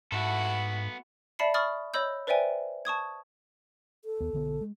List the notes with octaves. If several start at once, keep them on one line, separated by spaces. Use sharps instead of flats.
G#2 B3 E4 F#4 A4
D5 E5 A5 B5 C7 C#7
B5 C#6 D#6 F6 A6
C#5 D#5 B5 E6 G6
B4 C5 D5 E5 G5 G#5
A5 C#6 D#6 G#6
A4
D#2 B3
B1 D3 B3
G#3